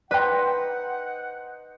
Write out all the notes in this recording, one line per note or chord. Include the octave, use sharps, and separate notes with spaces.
D#4 B4 C5 D5 F#5 G5 D6